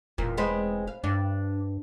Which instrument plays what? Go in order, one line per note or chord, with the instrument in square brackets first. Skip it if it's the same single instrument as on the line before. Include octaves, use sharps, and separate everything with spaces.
[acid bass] E1 [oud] A#2
[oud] G#3 B3 C4
F5
[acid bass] G2 [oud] D4